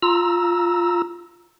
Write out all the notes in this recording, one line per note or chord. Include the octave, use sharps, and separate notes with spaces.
F4 A#5 E6